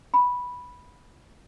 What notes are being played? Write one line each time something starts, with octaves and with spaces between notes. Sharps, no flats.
B5